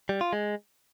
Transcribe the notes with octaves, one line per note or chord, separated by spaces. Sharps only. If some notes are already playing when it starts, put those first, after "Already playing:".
G3
F4
G#3